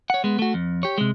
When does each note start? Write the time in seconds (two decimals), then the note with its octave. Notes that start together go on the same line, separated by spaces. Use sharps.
0.10 C#5 F#5
0.24 G#3 B3
0.39 A3 F#4
0.54 F2
0.83 G4 C#5
0.98 C3 G#3